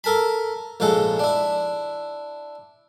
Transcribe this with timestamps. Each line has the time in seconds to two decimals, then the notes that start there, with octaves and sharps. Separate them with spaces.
0.04 A4 A#4 A5 B5
0.80 A#1 G#2 C#3 G#3 A4 F#5
1.19 D4 E4